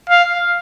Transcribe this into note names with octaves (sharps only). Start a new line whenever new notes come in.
F5